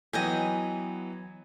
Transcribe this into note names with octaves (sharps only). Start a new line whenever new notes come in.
E3 F#3 B3 D#5 G5 G#5